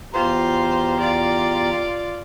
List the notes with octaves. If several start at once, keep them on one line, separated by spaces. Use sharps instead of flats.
E2 F4 G4 C5 A#5
F4 D5